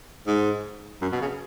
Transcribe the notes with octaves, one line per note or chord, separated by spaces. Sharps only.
G#2
F#2
B2
C#3